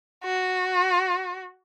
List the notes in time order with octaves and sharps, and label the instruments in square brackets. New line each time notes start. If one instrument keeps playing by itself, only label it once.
[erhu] F#4